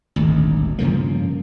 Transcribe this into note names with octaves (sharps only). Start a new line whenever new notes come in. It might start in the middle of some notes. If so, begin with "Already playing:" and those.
D#1 G#1 D2
G2 C#3 F3 A#3